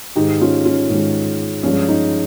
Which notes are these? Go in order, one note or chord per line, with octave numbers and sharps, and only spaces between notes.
G#2 D#3 G#3 D#4 G4
C#4 F4
C#4 F4
G#2 D#3 G#3 C#4
G2 F3 G#3 C#4
D#4